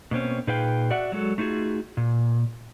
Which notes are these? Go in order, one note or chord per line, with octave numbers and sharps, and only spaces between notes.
B2 A#3 C4 C#4
A#2 D#4 G#4 B4 F5 G5
F#4 D5 E5 F#5
F#3 G#3 F#4 A4
A3 D#4 F4 F#4 G#4
A#2